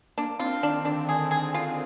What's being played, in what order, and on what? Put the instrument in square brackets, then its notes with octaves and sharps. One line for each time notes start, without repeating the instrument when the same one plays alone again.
[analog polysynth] A#3 [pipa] D4
[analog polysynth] C4 [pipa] F4
[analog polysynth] D#3 [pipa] D4
[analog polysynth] D3 [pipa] D4
[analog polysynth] D#3 [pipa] G#4
[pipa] G#4
[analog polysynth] D#3 [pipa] F4